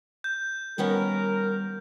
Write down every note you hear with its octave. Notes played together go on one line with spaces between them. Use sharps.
G6
D#3 G3 B3 C#4 A#4